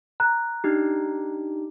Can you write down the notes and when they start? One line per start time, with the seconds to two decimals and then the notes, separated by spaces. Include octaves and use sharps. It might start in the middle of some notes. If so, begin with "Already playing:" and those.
0.20 A#5 F#6
0.64 D4 D#4 G4